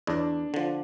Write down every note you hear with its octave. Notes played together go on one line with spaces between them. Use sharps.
E2 D4
D3 F3